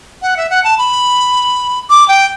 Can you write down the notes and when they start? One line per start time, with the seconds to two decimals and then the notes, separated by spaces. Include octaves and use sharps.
0.22 F#5
0.37 E5
0.50 F#5
0.64 A5
0.78 B5
1.90 D6
2.08 G5